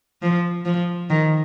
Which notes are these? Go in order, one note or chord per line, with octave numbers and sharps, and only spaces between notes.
F3
F3
D#3